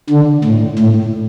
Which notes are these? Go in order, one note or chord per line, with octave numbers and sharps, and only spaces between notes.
D3
A2
A2